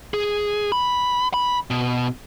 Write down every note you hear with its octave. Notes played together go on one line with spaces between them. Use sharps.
G#4
B5
B5
B2